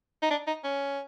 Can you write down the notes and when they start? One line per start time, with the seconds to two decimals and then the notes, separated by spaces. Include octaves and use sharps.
0.22 D#4
0.30 D4
0.47 D#4
0.64 C#4